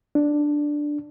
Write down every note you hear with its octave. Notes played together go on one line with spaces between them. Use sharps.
D4